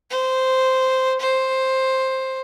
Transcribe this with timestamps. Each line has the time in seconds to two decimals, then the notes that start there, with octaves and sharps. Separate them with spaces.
0.10 C5
1.20 C5